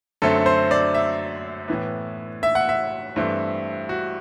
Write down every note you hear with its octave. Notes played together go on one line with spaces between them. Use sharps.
F#2 D3 A3 C4 A4
C5
D5
E5
A2 E3 B3
E5
F#5
E5
G2 E3 A3 C4
F#4